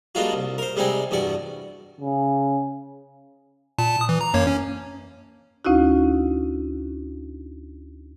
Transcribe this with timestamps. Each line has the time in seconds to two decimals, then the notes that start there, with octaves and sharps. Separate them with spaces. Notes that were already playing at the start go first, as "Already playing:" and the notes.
0.15 G3 G#3 A#3 D4 F4 F#4
0.33 C2
0.58 A#4 C5
0.76 C3 G3 G#3 C4 D#4 G#5
1.11 E2 G2 B2 D5 C#6
2.00 C#3
3.78 A#2 A5
3.97 A5 D#6
4.09 E3
4.21 A#5
4.34 F#2 A#3 C#5
4.47 C#4
5.65 D2 C#4 D#4 E4 F#4